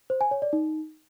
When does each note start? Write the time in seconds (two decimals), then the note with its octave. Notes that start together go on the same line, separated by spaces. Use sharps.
0.10 C5
0.21 G#5
0.31 C#5
0.42 D5
0.53 D#4